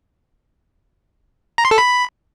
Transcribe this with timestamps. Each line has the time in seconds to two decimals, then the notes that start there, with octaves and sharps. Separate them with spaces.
1.58 A#5
1.65 C6
1.71 A4
1.78 B5